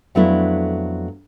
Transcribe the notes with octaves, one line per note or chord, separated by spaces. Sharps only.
F2 F#3 A3 B3 D4 E4